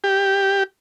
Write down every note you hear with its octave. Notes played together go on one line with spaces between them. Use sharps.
G4